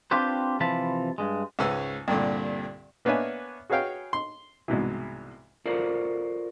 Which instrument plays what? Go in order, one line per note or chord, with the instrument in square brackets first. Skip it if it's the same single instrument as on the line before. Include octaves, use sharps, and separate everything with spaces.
[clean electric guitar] C4 D4 F4 G4 B4 C5
C3 E3 F3 F4 A5 B5
G2 G#3
[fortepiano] C#2 G#2 C#3 C#4 B4 E6
C2 G2 A#2 D3
A#3 B3 D4 C#5 E5 G#5
F#4 G#4 B4 C#5 F5 G5
C6
C2 G#2 B2 E3
[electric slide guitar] F4 F#4 A4 A#4 C5 D5